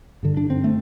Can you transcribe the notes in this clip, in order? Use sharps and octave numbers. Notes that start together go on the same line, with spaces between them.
G2 D3
D4
C4
A3